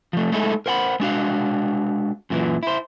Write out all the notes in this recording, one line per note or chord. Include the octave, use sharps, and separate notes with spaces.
F3 A3
G#3 A3 D#4 E4 G#4 A4
A#4 C5 F#5 G5 B5
G#3 D4 F#4 F5
F#2 A#2 D#3 E3
E4 C5